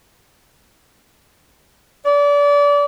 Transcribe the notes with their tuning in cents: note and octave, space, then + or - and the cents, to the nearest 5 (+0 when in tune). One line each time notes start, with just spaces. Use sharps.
D5 -30